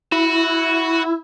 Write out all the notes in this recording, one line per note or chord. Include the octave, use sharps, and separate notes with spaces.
E4 F#4